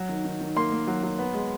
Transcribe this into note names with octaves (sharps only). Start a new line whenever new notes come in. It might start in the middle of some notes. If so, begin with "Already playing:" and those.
Already playing: F#3
D#3
D#3
D#3
A#3 C6
A#3
F#3
F#3
B3
G#3